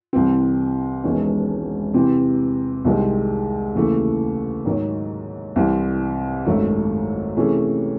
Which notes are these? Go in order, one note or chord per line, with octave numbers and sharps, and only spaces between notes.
C2 C3 E3 C4
E1 E2 D#3 G#3 C#4
C3 E3 C4
C2 C3 D#3 G#3 C4
D#2 C#3 E3 A3
G#2 D#3 F#3
C2 C3 E3 C4
G#1 F#2 D#3 F#3 A3
C3 E3 A3 C#4 G#4